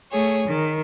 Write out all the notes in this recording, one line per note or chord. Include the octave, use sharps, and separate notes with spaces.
A3 G#4 C#5
D#3